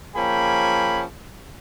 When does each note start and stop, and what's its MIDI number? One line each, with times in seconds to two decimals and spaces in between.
0.15 1.03 53
0.15 1.03 58
0.15 1.03 61
0.15 1.03 68
0.15 1.03 79
0.15 1.03 83